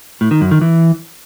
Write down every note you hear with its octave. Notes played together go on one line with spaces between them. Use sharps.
A2
D#3
F#2
D#3
E3